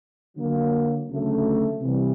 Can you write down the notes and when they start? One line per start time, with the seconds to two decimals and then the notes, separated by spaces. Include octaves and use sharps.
0.36 D3 F#3 A#3
1.08 D2 C#3 F#3 A3
1.80 C3 E3 G3